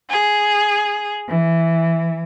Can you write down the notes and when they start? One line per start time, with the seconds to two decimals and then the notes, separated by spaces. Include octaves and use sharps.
0.11 G#4
1.27 E3